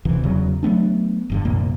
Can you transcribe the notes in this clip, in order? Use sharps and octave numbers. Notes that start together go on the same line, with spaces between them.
D#1 D2 C3 E3
E2 C#3 F#3
F#3 A3 B3 D4
F1 G2 D3
C2 F#2 A#2 A#3